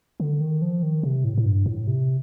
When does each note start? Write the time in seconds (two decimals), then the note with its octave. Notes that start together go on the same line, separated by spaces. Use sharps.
0.20 D3
0.41 D#3
0.62 F3
0.83 D#3
1.03 C3
1.24 A2
1.38 A2
1.45 G2
1.66 A2
1.87 C3